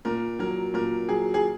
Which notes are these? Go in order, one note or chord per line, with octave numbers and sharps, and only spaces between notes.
A#2 A#4
F#3 A#4
A#2 A#4
F#3 G#4
G#4